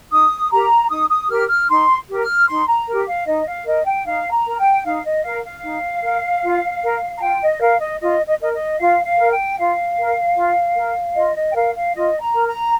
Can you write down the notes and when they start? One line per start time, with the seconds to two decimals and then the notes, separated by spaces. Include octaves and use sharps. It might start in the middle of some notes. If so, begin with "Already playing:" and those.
0.11 D#4 D#6
0.51 G4 A#4 A#5
0.90 D#4 D#6
1.10 D#6
1.30 G4 A#4 F6
1.49 F6
1.69 D#4 C6
2.09 G4 A#4
2.22 F6
2.48 D#4 C6
2.68 A#5
2.88 G4 A#4
3.07 F5
3.26 D#4 D#5
3.47 F5
3.66 A#4 D#5
3.85 G5
4.06 D#4 F5
4.32 A#5
4.46 A#4
4.59 G5
4.84 D#4 F5
5.05 D#5
5.24 A#4 F5
5.44 F5
5.63 D#4
6.03 A#4
6.43 F4
6.83 A#4
7.17 A#5
7.21 F4 G5
7.41 D#5
7.61 A#4 F5
7.80 D#5
8.00 F4 D#5
8.26 D#5
8.40 A#4 D#5
8.54 D#5
8.79 F4 F5
9.05 F5
9.18 A#4
9.32 G5
9.58 F4 F5
9.98 A#4
10.37 F4
10.76 A#4
11.16 F4 D#5
11.36 D#5
11.51 G5
11.55 A#4 F5
11.75 F5
11.95 F4 D#5
12.21 A#5
12.34 A#4
12.48 A#5